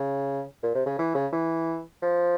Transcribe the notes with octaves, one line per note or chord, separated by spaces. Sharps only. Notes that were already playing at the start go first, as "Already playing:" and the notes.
Already playing: C#3
A#2
C3
C#3
E3
C#3
E3
F3